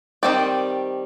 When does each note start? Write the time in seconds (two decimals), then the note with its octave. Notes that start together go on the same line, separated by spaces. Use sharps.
0.23 D#3 G3 C4 G4 D5